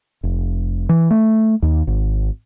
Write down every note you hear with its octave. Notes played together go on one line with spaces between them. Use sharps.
F1
E3
A3
D#2
G#1